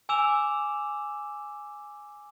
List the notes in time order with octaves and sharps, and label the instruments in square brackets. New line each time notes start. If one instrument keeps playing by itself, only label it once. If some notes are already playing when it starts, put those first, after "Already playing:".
[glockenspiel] G#5 D6 E6 E7 F7